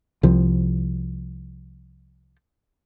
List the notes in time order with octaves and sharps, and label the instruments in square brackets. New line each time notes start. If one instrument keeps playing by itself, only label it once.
[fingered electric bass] C2 F3